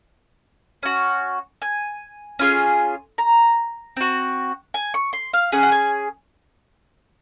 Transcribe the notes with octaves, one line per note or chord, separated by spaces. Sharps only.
C#4 F#4
G#5
C#4 F4 G#4
A#5
C4 F#4
G#5
C#6
C6
F5
C#4 G#4 F#5
F#5
G#5